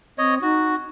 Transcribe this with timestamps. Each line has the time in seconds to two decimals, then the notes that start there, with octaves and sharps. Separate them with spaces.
0.18 C4 C#5 D#5
0.42 D#4 F#4